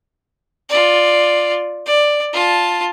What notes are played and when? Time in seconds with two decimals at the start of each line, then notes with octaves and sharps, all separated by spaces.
0.69 F4 D5
1.86 D5
2.33 F4 A5